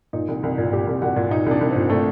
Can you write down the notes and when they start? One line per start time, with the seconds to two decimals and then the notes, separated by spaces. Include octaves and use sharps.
0.13 A#2 D#4
0.28 C2
0.43 C2
0.58 A#2
0.72 A#2 G4
0.87 C2
1.02 C2 F#4
1.16 A#2
1.31 A#2 D#4
1.46 C2 D4
1.61 C2
1.71 C4
1.76 A#2
1.90 A#2 A3